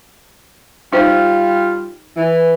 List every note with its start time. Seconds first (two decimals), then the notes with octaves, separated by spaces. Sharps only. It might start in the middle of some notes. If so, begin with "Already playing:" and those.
0.93 G3 D#4 F4 C5
2.17 E3